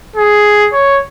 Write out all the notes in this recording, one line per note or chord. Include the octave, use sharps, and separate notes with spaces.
G#4
C#5